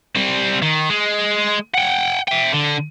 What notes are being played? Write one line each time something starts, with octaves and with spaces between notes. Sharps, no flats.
G3 C4
D#3
G#3
F#5 G5
E5 G5
D3